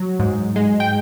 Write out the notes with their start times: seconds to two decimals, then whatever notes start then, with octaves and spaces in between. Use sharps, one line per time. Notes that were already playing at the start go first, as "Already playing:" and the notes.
Already playing: F#3
0.19 G#2
0.56 G#3
0.80 G5